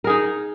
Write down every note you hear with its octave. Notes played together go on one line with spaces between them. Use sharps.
D#4 G#4 A#4